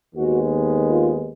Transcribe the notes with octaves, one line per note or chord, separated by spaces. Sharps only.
D#2 D#3 G#3 B3 F#4
F4